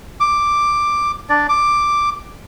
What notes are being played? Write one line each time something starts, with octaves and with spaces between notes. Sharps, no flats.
D6
D4 D5
D6